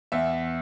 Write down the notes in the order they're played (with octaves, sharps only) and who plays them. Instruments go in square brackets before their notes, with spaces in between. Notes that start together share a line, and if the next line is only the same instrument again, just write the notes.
[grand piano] E2 E5